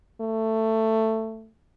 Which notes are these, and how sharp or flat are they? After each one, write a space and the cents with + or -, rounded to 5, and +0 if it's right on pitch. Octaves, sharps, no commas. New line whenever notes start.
A3 +15